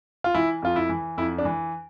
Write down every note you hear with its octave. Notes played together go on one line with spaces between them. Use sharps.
F4
E3 E4
F2 F4
E4
E3
F2 E4
D4
E3